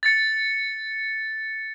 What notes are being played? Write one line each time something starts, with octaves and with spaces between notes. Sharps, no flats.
A6 C#7